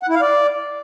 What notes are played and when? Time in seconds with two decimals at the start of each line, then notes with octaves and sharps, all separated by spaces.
0.03 F#5
0.09 E4
0.15 F5
0.21 D5